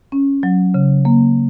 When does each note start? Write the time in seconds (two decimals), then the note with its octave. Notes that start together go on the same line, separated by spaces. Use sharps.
0.12 C#4
0.43 F#3
0.74 C#3
1.05 A#3